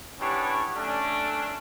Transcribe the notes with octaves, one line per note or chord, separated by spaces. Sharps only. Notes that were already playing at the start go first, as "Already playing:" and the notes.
B3 C#4 D4 E4 G4 C#5
A3 C#4 D4